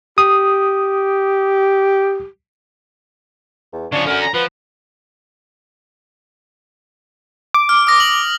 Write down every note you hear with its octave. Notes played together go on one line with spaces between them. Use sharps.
G4 D#6
E2
C#3 F3 D4 C#5
D3 C#4 F#4 A#4
A#5
F3 B4 F#5
D6
F6
D#6 A#6
F#7